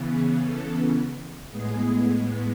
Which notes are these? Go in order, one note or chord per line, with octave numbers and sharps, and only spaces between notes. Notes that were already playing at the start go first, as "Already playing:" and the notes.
Already playing: C#3 E3 B3
G#4
A4
A2 G#3 B3 G#4